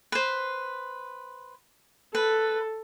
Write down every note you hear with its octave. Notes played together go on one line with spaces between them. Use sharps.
B4 C5
A4 B4